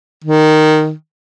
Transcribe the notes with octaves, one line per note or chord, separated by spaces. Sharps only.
D#3